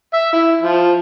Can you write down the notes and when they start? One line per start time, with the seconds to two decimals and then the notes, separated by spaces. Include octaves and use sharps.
0.13 E5
0.33 E4
0.62 F3